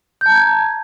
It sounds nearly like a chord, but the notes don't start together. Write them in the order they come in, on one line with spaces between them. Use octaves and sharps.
G6 A5 A#5 G#6